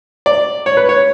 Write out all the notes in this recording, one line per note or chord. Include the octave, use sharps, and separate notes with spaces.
D5
C#5
B4
C#5